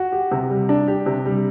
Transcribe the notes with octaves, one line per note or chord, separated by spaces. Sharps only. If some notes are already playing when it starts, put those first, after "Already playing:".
Already playing: F#4
G4
C3
G3
D4
G4
C3
G3